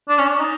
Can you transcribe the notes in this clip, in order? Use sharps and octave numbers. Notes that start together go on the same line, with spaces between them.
D4
C#4
D4
D#4